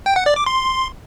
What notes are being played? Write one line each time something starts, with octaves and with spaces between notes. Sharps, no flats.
G5
F#5
D5
D6
C6